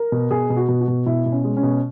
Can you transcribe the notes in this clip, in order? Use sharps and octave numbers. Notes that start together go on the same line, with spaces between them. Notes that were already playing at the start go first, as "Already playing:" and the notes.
Already playing: A#4
B2
B2 G#4
B2
F#4
B2
F#4
B2
B2 E4
B2
C#4
G#3
C#4
B2